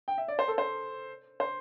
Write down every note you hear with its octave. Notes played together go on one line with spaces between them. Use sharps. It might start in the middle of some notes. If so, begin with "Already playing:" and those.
G5
E5
D5
C5
A4
C5
C5